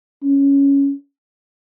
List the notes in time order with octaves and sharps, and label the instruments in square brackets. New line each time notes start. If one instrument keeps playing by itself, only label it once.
[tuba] C#4